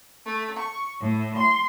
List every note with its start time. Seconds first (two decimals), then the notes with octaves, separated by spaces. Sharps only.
0.25 A3
0.59 C#6
1.00 A2
1.38 C6